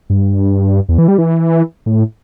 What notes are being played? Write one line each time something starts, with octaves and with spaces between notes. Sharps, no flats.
G2
E2
E3
G3
E3
A2